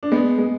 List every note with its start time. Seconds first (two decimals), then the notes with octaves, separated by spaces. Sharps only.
0.03 D4
0.12 G#3 B3
0.38 G#3